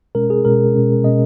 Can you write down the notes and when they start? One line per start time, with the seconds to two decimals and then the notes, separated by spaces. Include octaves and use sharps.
0.15 B2 G#3 C#4 A#4
0.30 G#4
0.45 B2 G#3 C#4 A#4
0.75 B2 G#3 C#4
1.04 B2 G#3 C#4 D#5